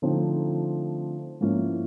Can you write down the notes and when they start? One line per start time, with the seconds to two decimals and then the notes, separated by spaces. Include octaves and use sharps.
0.02 D3 F3 A3 C4 D#4
1.40 G#2 F3 A#3 C#4 E4